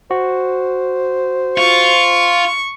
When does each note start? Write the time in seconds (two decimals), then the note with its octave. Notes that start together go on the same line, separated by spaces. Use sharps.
0.11 F#4 C5
1.58 F4 C#6